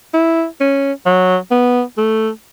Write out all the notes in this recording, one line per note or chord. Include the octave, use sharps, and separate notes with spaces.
E4
C#4
F#3
B3
A3